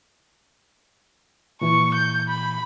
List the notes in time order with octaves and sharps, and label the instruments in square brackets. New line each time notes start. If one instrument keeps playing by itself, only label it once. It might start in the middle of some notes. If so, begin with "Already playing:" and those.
[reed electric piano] A#2 E3 [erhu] C#6
[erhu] G6
B5